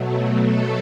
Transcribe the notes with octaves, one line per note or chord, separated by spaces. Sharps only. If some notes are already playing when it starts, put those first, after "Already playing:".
Already playing: B2 F#3 A3
A4